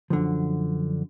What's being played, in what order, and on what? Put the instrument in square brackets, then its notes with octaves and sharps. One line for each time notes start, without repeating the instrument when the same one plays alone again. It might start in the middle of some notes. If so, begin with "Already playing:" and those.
[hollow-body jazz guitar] F#2 D3 D#3 F3